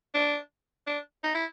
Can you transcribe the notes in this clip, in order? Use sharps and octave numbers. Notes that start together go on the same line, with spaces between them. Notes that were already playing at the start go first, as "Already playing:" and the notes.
D4
D4
D#4
E4